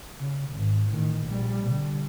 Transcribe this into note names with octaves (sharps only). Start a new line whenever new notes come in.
C#3
G#1
A1 D#3
A#1 G3
D3 G3